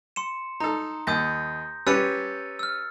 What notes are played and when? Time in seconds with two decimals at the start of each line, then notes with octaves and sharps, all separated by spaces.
0.16 C6 C#7 E7
0.60 D#4 A4 A#5
1.07 D#2 D#6 G6 A#6
1.87 C#4 G4 B4 E6 A6 C#7
2.59 E6 F6